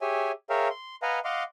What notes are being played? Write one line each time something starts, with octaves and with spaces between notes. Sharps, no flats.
G4 G#4 C#5 E5 G#5
G#4 A#4 C#5 E5 F5 G5
C6
B4 D#5 F5 F#5 G#5 A#5
D#5 F5 F#5 C6 D6